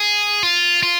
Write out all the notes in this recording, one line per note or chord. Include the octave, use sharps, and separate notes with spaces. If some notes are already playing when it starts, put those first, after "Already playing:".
Already playing: G#4
F4
F4